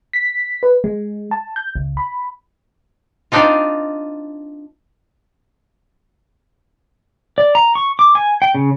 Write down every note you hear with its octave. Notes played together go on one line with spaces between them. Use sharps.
B6
B4
G#3
A5
G6
C#2
B5
C4 D4 D#4 F4
D5
A#5
C#6
D6
G#5
G5
C#3